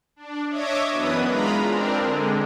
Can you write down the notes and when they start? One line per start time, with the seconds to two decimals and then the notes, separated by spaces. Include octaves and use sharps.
0.16 D4
0.49 C#5 D#5 E5 D6 G#6
0.89 F#2 E3 B3 D4 B4 D#6
1.25 G#3 F4 A#5 B5
1.63 C4 D4 A#4
1.99 D3 G#3